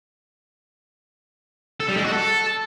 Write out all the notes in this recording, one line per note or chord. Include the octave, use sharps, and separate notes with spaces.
A4
G3
G#3
F#4
A4